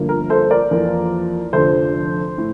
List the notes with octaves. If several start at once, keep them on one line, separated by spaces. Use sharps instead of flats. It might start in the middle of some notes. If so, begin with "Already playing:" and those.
Already playing: G1 G2 F3 A#3
A#4
A4 C5
A#4 D5
F2 E3 A#3 F4
F1 F2 D3 A4 C5
A2